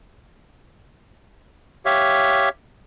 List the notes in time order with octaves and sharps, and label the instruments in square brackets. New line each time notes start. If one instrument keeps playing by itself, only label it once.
[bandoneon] G4 C#5 E5 F5